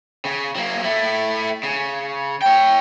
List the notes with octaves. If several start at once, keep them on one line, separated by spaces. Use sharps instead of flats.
C#3
F#3 A#3
A3 E4
C#3
C#5 G5